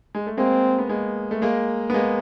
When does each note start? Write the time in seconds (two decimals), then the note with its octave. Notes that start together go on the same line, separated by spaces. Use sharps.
0.15 G#3
0.27 A3
0.37 G#3 A#3 C4
0.79 B3
0.89 G#3 A#3
1.31 A3
1.42 G#3 A#3
1.90 B3
1.94 G#3 A#3